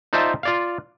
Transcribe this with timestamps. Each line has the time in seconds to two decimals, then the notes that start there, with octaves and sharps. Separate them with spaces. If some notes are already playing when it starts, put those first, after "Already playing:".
0.13 D#4 F4 C5 D5 E5 A5
0.43 F4 D5 F5